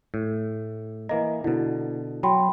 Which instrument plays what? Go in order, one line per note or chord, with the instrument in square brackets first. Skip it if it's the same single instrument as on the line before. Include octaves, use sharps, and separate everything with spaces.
[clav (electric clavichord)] A2
[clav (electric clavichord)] E3 A#3 A#5 [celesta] D#5
[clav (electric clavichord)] B2 D3 [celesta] E4
[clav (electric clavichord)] F#3 [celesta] G5 B5 C6